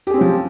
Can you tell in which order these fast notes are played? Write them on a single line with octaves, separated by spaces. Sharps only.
G4 G#4 C4 C#4 F3